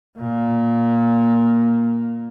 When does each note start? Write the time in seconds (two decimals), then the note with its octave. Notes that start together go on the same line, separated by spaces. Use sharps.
0.17 A#2 A#3